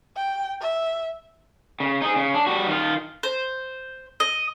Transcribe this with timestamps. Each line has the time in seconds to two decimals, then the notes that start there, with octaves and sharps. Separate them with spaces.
0.16 G5
0.61 E5
1.80 C#3
2.02 D#4 G#4
2.16 C#3
2.34 D4
2.46 G3 F#4
2.67 D#3 F4
3.23 C5
4.20 D#5